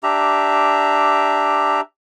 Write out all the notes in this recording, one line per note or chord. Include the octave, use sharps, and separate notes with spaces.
D4 G4 E5 A#5